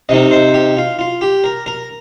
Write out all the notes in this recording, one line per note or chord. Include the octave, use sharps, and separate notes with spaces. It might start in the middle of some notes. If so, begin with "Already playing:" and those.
C3 D#3 C4 D#5
C5
G4
F4
F4
G4
A#4
A#4